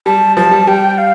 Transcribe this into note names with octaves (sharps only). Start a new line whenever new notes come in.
G3 A5
F3 A5
G3
G3 G5
F5